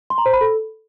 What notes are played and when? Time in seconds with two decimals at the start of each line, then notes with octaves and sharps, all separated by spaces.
0.10 C6
0.18 A#5
0.26 C5
0.33 B5
0.41 A4